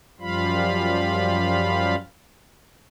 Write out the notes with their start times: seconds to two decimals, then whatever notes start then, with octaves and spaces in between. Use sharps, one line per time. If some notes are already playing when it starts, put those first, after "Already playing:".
0.20 F#2 F3 G3 F4 F5 B5